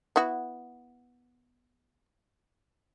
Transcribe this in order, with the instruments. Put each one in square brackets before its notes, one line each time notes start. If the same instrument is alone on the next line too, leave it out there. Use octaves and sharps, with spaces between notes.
[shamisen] B3 E4 F#4